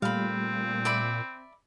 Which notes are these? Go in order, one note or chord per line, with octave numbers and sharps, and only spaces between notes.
A#2 G3 A3 C4 F5 B5
D5 E5 B5